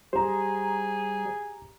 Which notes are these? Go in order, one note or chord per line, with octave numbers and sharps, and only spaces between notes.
G3 G4 G#4 C5 A#5